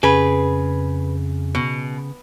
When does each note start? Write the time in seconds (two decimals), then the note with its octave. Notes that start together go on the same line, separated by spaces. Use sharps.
0.03 F2 C#3 G#4 B4
1.55 B2